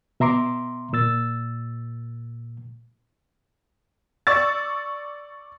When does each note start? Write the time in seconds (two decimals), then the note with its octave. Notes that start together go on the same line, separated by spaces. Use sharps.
0.20 B2 E5 A#5 C6 D6
0.93 A#2 E6 A6
4.27 D5 C#6 E6 A6